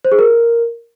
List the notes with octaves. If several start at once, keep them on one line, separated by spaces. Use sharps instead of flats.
C5
G#4
A#4